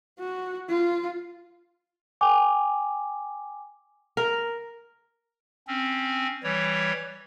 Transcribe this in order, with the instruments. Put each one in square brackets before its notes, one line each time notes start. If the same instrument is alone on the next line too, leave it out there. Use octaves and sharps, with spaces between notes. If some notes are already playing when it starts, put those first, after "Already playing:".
[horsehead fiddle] F#4
F4
[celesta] G5 G#5 D6
[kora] A#4
[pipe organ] C4 C#4
E3 G3 C#5